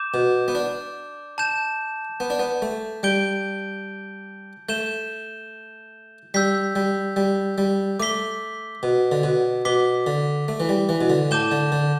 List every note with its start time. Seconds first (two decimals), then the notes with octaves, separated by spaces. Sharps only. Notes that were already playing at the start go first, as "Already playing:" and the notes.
Already playing: D6 G6 E7
0.14 B2
0.48 B3
0.55 D4
1.38 A5 G6 E7
2.20 B3
2.30 D4
2.39 B3
2.62 A3
3.03 G3 G6 D7 G7
4.69 A3 G6 E7 G7
6.34 G3 E6 G6 B6
6.76 G3
7.16 G3
7.58 G3
7.99 A3 D6 B6 G7
8.83 B2
9.12 D3
9.24 B2
9.65 B2 D6 B6 G7
10.07 D3
10.48 A3
10.60 E3
10.69 G3
10.89 E3
11.01 B2
11.10 D3
11.31 A2 A5 D6 G6 E7 G7
11.51 D3
11.72 D3